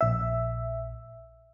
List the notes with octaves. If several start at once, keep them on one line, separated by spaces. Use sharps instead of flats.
A#1 E5